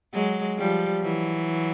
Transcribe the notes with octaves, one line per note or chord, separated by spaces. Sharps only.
F#3 G#3
F3 G3
E3 F#3